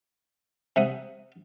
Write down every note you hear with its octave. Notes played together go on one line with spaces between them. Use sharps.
C3 E5 F#5 D#6